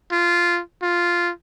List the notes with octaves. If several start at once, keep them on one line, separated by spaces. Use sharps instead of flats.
F4
F4